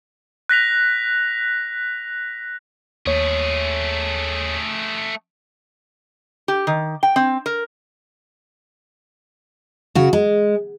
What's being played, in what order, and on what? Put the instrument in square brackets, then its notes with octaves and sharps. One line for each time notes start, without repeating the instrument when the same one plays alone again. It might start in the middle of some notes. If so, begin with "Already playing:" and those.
[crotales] F#6 A#6 B6 F7
[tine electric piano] D#2 C#5 [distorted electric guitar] A3 G#4
[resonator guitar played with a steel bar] G4
D#3
G5
C4
A#4
[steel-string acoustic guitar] C#3 F#4
G#3